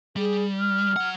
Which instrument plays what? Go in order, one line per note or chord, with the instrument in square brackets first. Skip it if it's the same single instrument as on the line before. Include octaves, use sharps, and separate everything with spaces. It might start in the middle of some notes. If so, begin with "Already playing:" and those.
[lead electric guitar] G3 [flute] G#4
[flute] F6
[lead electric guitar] F#3 F#5